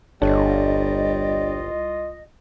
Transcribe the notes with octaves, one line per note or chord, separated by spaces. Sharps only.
G1 C2 G3 D4 F4 A4 C#5 D#5